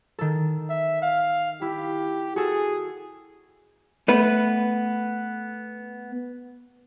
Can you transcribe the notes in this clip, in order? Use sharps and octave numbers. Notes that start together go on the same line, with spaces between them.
D#3 A4
E5
F5
E4 G4
F#4 G#4 A4
A3 B3 B4